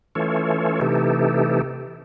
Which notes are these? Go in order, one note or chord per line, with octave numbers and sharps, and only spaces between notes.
E3 A3 C#4 F4 A4 C#5
C3 E3 A3 D#4 G4 A4